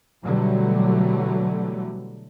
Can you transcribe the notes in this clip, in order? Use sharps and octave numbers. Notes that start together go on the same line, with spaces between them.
B2 D3 E3 F#3 G3 A3